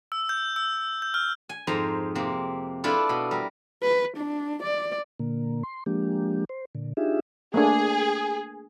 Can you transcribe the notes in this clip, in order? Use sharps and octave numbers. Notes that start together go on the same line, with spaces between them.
E6
G6
E6
G6
F6
G#5
F2 G#2 C5 A#5
C3 A#3 C4
D4 E4 F4 A4 B4 D5
B2
G3 A#4
B4
D4
D5
A#2 D3 A#3
C6
F3 G#3 A#3 D4 G4
C5
A#2 D3
D4 D#4 F4 G4 G#4 E5
A3 A#3 D4 G#4